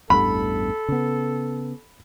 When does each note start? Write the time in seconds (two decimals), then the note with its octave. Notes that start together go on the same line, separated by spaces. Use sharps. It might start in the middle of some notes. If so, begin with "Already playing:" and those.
0.10 A1 E2 G2 A4 B5
0.89 C#3 B3